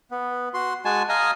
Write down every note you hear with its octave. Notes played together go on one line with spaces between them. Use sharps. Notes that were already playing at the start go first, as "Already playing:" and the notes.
B3
F#4 C6
G#3 F#4 G#5 A5
D#5 F5 G#5 A#5 D#6